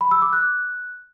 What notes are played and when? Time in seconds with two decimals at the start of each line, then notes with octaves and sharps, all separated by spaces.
0.01 B5
0.11 E6
0.22 D6
0.33 F#6